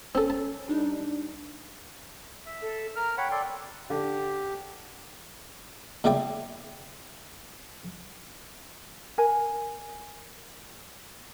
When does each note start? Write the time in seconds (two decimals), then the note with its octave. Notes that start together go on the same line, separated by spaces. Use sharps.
0.15 C4 C#4 A4
0.30 A5
0.68 G3 D4 D#4
2.46 E5
2.62 A4
2.96 A#4 A#5 F6
3.17 C#5 F#5 G5 B5
3.31 A4 D5 C6
3.90 D3 G4
6.04 A#2 C#3 E4 D5 G5
9.18 A#4 G#5